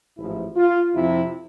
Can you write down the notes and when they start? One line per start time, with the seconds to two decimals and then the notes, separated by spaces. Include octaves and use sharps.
0.18 A1 G#2 F3 E4
0.56 F4
0.94 F2 C3 F3 E4